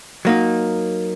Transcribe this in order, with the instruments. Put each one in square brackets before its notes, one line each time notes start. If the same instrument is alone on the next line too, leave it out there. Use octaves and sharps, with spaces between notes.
[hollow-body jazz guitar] F#3 A#3 D#4